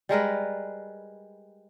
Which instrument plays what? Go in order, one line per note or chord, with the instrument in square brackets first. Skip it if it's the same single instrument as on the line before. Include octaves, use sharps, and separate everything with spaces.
[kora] G3 G#3 A#4 B4